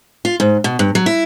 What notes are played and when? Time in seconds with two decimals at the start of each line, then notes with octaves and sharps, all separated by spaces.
0.25 F4
0.40 G#2
0.64 B2
0.79 G2
0.95 F#3
1.06 E4